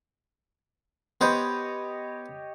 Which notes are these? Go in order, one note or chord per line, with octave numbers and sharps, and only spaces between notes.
B3 G4 C5 C#5 D#5